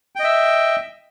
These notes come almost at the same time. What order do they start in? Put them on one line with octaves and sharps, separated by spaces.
G5 D#5 E5